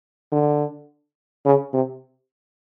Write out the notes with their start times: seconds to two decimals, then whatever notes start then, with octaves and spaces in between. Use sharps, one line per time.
0.32 D3
1.45 C#3
1.73 C3